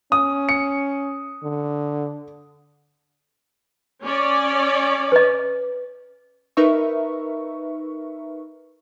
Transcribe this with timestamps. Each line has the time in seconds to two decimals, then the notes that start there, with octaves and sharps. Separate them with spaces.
0.12 C#4 D#6
0.49 C#7
1.43 D3
4.04 C#4 D5
5.12 B4 D#5
6.57 D#4 A#4 B4 E5 C#6